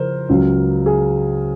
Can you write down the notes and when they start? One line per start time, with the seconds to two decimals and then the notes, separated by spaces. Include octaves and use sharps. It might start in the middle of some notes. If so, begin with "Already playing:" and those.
Already playing: C#3 F3 A#4 C5
0.29 C#2 C#3 F#3
0.86 G#4